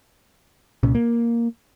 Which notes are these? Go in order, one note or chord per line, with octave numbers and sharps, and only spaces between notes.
C2 A#2 C#4
A#3